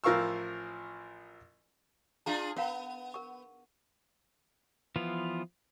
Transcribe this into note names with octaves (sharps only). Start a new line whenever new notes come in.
A1 F3 A#4 F5 C#6 E6
D4 F4 G#4 F5 A#5
B3 A#4 F5 A#5
A#4 C#6
E3 F3 B3 F4